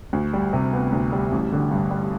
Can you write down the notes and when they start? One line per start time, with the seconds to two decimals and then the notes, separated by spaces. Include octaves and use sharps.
0.13 D2
0.33 G3
0.53 C3
0.73 B3
0.93 D2
1.12 G3
1.32 A1
1.52 D3
1.71 G2
1.91 G3